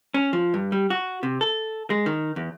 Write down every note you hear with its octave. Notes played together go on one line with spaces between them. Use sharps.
C#4
F3
G2
G3
F#4
C3
A4
G#3
D#3
E2